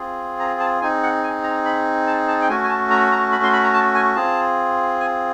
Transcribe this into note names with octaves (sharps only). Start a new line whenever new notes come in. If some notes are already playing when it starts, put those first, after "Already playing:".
Already playing: C4 F4 G#4
A#5
A5
C4 D#4 G#4 G#5
F#5
G#5
A#5
B5
A5
A5
G5
A3 C#4 F#4 G#5
G#5
A5
A#5
A#5
B5
C6
B5
A#5
A5
G#5
C4 F4 G#4 A5
G#5